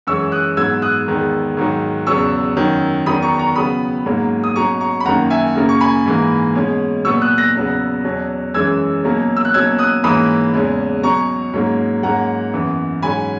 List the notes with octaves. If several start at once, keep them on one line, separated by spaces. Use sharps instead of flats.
F#2 E3 G#3 C#4 C#6 E6
D#6 F#6
G#2 F#3 B3 E6 G#6
D#6 F#6
E2 D#3 G#3 B3
G#2 D#3 F#3
E2 C#3 F#3 B3 C#6 E6
F#2 D#3 F#3 C#4
E2 D#3 F#3 B3 B5 D#6
A#5 C#6
A#5 C#6
C#3 F#3 B3 B5 D#6
G#2 F#3 A#3 C#4
D#6
B2 F#3 C#4 A#5 C#6
A#5 C#6
B5
F#2 D#3 F#3 A#3 F#5 A#5
E5 G#5
F#2 C#3 F#3 A#3
C#6
G#5 B5
G#2 E3 A#3
B2 G#3 C#4
A#2 F#3 B3 C#6 E6
D#6 F#6
F#6 A#6
E2 C#3 F#3 B3
E2 B2 F#3 C#4
F#2 E3 G#3 C#4 E6 G#6
B2 F#3 A#3 C#4
E6
F#6
B2 F#3 A#3 C#4 E6 G#6
D#6 F#6
G#2 E3 A#3 C#4 B5 D#6
E2 C#3 G#3 C#4
B2 F#3 C#4 A#5 C#6
G#2 F#3 A#3 C#4
G#2 F#3 A#3 C#4 F#5 A#5
F#2 E3 B3
G#2 F#3 C#4 G#5 B5